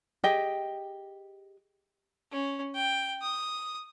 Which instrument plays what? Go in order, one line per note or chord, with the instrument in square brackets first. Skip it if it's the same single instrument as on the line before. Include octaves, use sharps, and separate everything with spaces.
[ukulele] G4 G#4 D#5 G5
[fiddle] C#4
G5
D#6